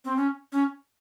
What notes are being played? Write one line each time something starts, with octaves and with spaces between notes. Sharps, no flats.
C4
C#4
C#4